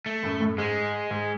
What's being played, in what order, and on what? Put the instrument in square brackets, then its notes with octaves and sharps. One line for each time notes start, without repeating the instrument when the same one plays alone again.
[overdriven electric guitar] A3
[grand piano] F#2 A2
F#2 A2
[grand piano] G#2 [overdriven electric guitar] G#3
[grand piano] G#2